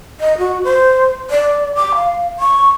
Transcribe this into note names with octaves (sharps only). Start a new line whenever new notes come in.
D#5
F#4
C5
D5
D6
F5
C#6